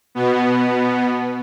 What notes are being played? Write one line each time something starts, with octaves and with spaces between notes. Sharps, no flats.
B2 B3